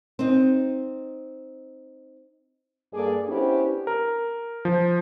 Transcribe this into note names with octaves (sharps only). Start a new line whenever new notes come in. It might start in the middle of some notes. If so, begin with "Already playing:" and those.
C4 D#4
G2 A#3 G#4 A4 D5
B3 C#4 D4 E4 G4 C5
A#4
F3